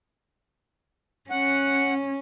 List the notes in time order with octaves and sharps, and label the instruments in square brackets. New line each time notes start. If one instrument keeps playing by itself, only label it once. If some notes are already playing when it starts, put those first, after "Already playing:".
[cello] C#4 [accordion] F#5